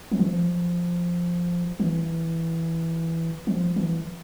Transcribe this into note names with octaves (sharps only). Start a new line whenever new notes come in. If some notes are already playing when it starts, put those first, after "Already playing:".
F3
E3
F3
E3
F3
E3